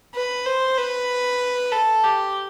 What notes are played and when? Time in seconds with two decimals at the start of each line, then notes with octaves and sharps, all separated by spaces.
0.15 B4
0.46 C5
0.78 B4
1.72 A4
2.04 G4